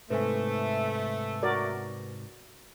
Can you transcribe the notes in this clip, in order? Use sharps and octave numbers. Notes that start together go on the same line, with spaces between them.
G#2 C3 A3 B4 C5 G#5
F#4 A#4 D5